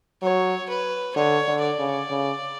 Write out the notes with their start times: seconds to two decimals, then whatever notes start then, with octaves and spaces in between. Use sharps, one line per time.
0.23 F#3 C#5
0.69 B4
1.16 D3 C#5
1.48 D3
1.63 D5
1.79 C#3
2.10 C#3